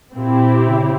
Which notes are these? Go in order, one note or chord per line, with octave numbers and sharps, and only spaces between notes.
A#2 C4 E4 G4
C#3